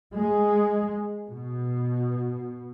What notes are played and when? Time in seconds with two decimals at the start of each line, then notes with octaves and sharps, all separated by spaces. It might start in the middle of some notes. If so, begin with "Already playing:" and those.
0.14 G#3
1.26 B2